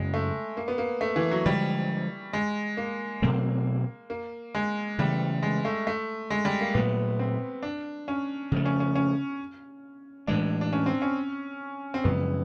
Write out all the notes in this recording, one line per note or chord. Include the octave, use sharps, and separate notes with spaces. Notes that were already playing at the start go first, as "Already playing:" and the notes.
Already playing: F#2 C#3 F#3 G#3 A#3
A3
A#3
B3
A#3
A3
E3
F#3
D3 F3 G3 G#3
G#3
A#3
B2 F#3 A3 A#3 C4
A#3
G#3
C#3 E3 G3 A3
G#3
A3
A3
G#3
G3
A#3
A#2 F#3 A3 B3
C4
D4
C#4
C#3 F3 A3
C#4
C#4
C#4
A2 E3 G#3 D4
D4
C#4
C4
C#4
C4
F#2 C#3 F3 G#3 B3